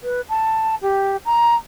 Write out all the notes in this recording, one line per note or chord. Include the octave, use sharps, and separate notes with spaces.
B4
A5
G4
A#5